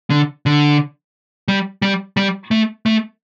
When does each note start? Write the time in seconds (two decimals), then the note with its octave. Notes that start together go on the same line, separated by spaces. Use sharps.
0.10 D3
0.46 D3
1.48 G3
1.82 G3
2.17 G3
2.51 A3
2.86 A3